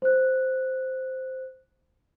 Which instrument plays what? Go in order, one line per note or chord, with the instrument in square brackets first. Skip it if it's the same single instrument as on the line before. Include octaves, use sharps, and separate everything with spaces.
[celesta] C5 F#6